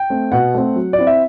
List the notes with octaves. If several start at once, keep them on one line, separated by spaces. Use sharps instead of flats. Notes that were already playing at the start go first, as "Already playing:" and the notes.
Already playing: G5
A3 C4
B2 F#5
A3 C4
F#3
D5
C4 E4
E5